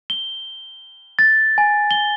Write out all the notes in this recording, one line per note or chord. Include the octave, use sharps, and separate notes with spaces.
G7
A6
G#5
G7